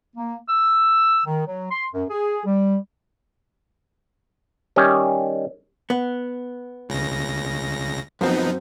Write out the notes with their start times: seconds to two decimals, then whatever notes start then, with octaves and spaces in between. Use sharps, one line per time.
0.16 A#3
0.49 E6
1.26 D#3
1.47 F#3
1.71 C6
1.93 F#2
2.10 G#4
2.46 G3
4.76 D#3 G3 C#4
5.90 B3
6.89 C#2 C#3 A#6
8.21 F#2 F3 B3 C4 D#4